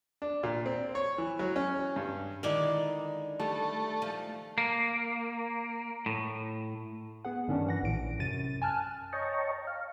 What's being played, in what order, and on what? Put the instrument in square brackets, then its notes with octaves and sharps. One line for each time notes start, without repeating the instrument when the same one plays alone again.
[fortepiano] D4
A#2
C4
C#5
E3
F#3
C#4
G2
[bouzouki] D3 G#3 D#4 [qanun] D#3 E4 D5
[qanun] G3 [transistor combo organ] A3
[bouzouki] F3
[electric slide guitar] A#3
A2
[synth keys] B3 G#4 F#5
G2 D#3 G3 C#4 D4
E3 F#5 A#6
A#1 A2 D7
F#2 C3 A6 D#7
G#5 A5 F6 F#6
[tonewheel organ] C#5 D#5 G5 A5 A#5 C#6
F5